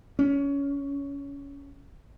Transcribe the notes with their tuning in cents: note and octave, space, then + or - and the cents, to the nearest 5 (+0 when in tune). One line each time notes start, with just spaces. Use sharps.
C#4 +20